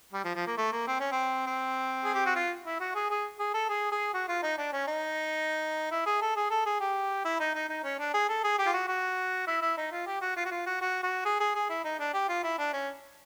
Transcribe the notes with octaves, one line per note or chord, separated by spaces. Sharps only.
G3
F3
F3
A#3
A3
A#3
C4
C#4
C4
C4
G#4
G4
F#4
F4
E4
F#4
G#4
G#4
G#4
A4
G#4
G#4
F#4
F4
D#4
D4
C#4
D#4
E4
G#4
A4
G#4
A4
G#4
G4
E4
D#4
D#4
D#4
C#4
D4
G#4
A4
G#4
G4
F4
F#4
F#4
E4
E4
D#4
F4
G4
F#4
F4
F#4
F4
F#4
F#4
F#4
G#4
G#4
G#4
E4
D#4
D4
G4
F4
E4
D4
C#4